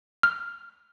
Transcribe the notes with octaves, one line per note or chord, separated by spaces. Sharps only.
F6